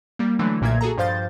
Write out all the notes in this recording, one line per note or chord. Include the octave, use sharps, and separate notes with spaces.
G3 A#3
D3 E3 F#3 A3
B1 A#2 A#3 E5 G#6
F#4 G#4 A4 A#5
G2 F3 C5 F5 G6 A6